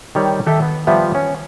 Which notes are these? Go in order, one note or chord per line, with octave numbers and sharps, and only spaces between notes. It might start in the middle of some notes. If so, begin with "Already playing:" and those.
D#3 G3 C#5
D#3 G4 A4 E5
B3
F3 G3 B3 E5
C#4